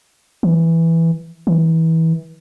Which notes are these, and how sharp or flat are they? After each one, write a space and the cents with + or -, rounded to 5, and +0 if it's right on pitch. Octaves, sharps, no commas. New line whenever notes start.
E3 +0
E3 -25